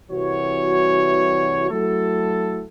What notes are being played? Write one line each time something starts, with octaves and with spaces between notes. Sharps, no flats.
C2 E3 F#4 C#5
F#3 A3 E4 F#4 A4